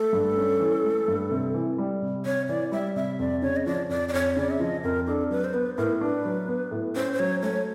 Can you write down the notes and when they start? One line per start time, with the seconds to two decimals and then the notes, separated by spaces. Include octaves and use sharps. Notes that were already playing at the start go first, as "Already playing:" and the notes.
Already playing: A3 A4
0.13 G2
0.37 C#4
0.60 E3
0.84 A3
1.08 G2
1.31 C3
1.54 E3
1.78 G3
2.02 C3
2.25 C3 C#5
2.49 E3 D5
2.72 G3 E5
2.96 C3 E5
3.19 F2 D5
3.42 C#3 C#5
3.56 D#5
3.66 F3 D5
3.89 F2 D5
4.08 D5
4.13 F2 C#5
4.36 C#3 D5
4.50 E5
4.60 F3 D#5
4.84 F2 A#4
5.07 D4 A4
5.30 F#3 B4
5.44 C5
5.54 B3 B4
5.77 A2 A#4
6.01 D4 B4
6.25 F#3
6.48 B3
6.71 A2
6.96 C#4 C5
7.13 C5
7.19 F#3 C#5
7.42 A3 C#5